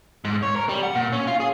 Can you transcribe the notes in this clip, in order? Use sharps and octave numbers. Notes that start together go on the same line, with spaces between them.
G#2
C#5
A#4
G3
F#5
A#2
C#4
F4
G#4